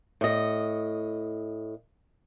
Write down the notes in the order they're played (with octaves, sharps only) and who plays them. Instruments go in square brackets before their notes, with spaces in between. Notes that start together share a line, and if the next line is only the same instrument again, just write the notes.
[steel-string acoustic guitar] A2 D#5